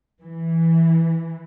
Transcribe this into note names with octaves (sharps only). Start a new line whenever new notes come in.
E3